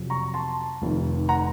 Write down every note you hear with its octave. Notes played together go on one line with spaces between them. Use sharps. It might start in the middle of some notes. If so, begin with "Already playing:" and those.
Already playing: F2 C3 F#3
A#5 C#6
A5 C6
F1 F2 D#3
F#5 A#5